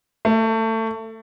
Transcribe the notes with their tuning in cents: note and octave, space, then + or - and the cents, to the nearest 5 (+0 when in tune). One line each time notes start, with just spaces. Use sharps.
A3 +25